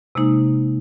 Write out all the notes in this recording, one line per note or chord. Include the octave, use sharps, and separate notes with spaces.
C3 G#3 A#3 D#4 C5